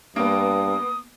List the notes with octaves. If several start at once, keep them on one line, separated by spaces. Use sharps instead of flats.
G2 A#3 B3 D#6